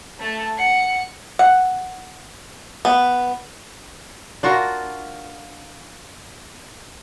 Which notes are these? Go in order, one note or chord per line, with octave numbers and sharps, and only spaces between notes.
A3 A4
F#5 C#7
F#5
B3
D4 F4 F#4 A#4